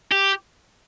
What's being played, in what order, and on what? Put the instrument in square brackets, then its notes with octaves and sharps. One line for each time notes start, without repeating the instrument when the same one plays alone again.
[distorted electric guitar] G4